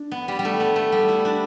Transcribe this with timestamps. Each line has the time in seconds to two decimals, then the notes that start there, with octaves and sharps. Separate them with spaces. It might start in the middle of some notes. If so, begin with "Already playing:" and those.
Already playing: D4
0.12 B3
0.28 G3
0.39 G3
0.45 A3
0.60 B3
0.76 A3
0.92 G3
1.08 E4
1.25 D4